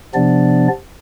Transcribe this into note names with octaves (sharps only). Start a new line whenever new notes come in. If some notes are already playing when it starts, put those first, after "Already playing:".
C3 F3 B3 D4 D5